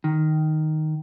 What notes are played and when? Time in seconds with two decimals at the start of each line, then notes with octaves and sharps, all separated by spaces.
0.04 D#3